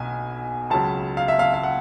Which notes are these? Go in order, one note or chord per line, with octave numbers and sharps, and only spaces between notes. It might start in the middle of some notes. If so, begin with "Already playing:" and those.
Already playing: B1 B2 G#5
C#2 C#3 F#3 A5
F5
E5
F5
F5
F#5